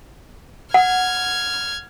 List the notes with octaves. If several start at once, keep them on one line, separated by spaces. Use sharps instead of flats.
F#5 F6 G#6